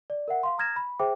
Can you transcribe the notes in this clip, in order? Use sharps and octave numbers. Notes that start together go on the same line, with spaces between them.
D5
A#4 E5 F#5
F5 C6
A#5 D#6 F6 G#6 A#6 E7
B5
G#4 C5 E5 G5 D6